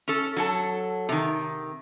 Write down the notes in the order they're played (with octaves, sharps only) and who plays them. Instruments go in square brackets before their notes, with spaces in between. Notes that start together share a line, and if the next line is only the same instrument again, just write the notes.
[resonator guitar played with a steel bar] C#4 A4
F#3 A4 A5
C3 D#3